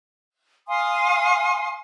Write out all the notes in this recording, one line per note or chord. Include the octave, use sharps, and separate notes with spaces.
F5 G#5 C6 D#6